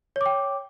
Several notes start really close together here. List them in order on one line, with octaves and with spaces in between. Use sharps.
C#5 D6 G5